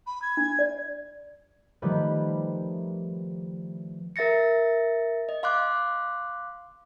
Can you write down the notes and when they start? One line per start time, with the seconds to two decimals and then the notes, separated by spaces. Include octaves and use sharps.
0.07 B5
0.22 G#6
0.37 D4
0.59 D5
1.82 D#3 F3 G3 A3 G4 B4
4.16 A#4 E5 A6 A#6 C#7
5.29 D#5
5.43 F5 C6 D6 F#6